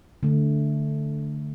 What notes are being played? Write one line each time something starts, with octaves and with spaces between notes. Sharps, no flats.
D3 A3